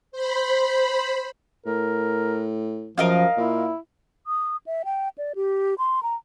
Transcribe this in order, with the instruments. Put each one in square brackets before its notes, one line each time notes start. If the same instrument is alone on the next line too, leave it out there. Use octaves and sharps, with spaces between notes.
[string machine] C5 B5
[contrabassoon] A2 [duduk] A#4
[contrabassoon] F#2 [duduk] F3 [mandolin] A#4 D#5 F5
[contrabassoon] A#2 [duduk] E4
[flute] D#6
E5
G5
D5
G4
C6
A#5